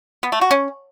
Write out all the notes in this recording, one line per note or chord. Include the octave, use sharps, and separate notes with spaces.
B3
A3
F#4
C#4